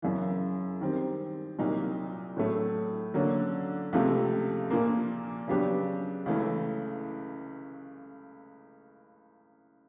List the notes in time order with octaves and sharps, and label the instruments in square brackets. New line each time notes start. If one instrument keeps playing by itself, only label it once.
[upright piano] F#2 C#3 E3
D#3 G3 C4
C2 A#2 F#3 A#3 D#4
A2 F#3 A3
D3 F#3 A#3 C#4
C#2 C3 F3 A3
A#2 F3 A#3
C#3 F#3 B3 D4 G4
C#2 C#3 E3 A3